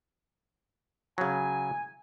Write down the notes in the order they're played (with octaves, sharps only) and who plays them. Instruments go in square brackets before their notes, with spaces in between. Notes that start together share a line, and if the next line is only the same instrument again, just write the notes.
[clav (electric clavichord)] C#3 F#3 [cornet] G#5